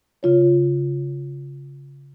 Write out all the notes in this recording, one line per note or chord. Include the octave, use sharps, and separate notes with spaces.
C#3 F4 C#5